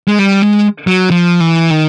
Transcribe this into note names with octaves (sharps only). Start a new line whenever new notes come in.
G#3
G3
G#3
F#3
F3
E3
D#3